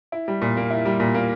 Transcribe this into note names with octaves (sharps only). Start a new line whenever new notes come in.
E4
G3
A#2
A#3
E4
G3
A#2
A#3